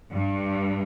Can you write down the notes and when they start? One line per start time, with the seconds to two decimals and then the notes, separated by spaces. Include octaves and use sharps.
0.14 G2